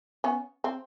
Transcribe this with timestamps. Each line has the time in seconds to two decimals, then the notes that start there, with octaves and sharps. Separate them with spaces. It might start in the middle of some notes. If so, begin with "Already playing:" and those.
0.24 B3 C#4
0.64 C4